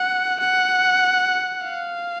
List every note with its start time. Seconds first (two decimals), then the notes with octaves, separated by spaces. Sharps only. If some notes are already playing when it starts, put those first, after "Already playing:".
Already playing: F#5
0.40 F#5
1.64 F5